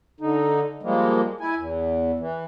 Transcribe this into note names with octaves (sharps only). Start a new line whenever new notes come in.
D3 D#4
F3 G3 G#3 A#3
E4 G#5
E2
E3